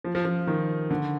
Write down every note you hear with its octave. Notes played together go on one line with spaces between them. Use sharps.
F3
F3
F3
D#3
D3